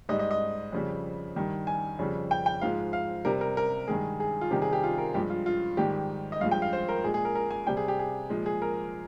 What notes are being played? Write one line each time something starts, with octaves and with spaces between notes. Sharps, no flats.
G#2 G3 D#5
D#5
D#5
F2 C#3 G3
G2 D#3 G3
G#5
F2 C#3 G3
G5
G5
G#2 F3 G#3 F5
F5
C3 G3 A#4
A#4
A#4
G2 D#3 G#3 G#4
G#4
F4
C3 D#3 G3 G4
G#4
G4
F4
A#4
G2 F3 G#3 G4
F4
F4
G#2 D#3 G3 G4
D#5
G2 F3 G#3 F5
G5
F5
C5
A#4
A#2 G#3 G#4
G#4
A#4
A#4
G#5
C3 G3 G5
G#4
G4
G#4
A#2 F3 G#3
G#4
A#4